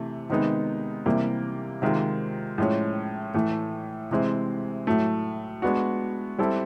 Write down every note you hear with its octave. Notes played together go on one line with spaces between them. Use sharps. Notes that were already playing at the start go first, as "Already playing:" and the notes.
Already playing: C3 E3 A3
C3 D#3 G#3 B3 D#4
C3 E3 G3 A#3
C3 D#3 G#3 C4 F4
A2 F3 G#3 C#4
A2 E3 A3
C3 E3 G#3 C4
A2 F#3 A3
G#3 B3 D4 F#4
G3 C4 E4 A4